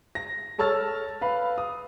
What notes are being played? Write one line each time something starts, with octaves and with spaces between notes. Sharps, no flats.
A#6
A4 C#5 A5 E6 F6 A6
B4 F5 B5
D#6